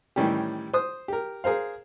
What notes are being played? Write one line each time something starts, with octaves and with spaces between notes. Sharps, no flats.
A2 D#3 E3 G3 C#4 G4
C5 D#6
G4 A#4
G#4 A#4 C5 F5